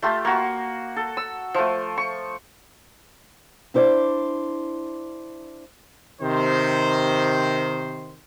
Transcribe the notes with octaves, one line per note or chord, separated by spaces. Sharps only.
A3 F4 G4
A#3 F#4
A4
E6
F3 A3
C#6
D4 E4 C5 D5
C3 D#3 C5